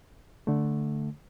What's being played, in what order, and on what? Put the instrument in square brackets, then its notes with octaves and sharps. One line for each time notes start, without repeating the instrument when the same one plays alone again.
[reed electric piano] D3 A3